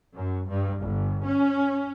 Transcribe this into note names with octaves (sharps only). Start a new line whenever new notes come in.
F#2
G2
G1
C#4